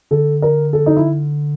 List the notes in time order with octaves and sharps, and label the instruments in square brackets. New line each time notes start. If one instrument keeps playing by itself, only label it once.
[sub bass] D3 [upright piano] A4
[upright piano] A#4
A4
D#4
E4